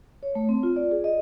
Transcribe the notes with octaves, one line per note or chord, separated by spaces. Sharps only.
C#5
A3
C4
F4
D5
G#4
D#5